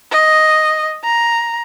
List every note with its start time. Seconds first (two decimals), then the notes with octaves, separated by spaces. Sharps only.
0.11 D#5
1.04 A#5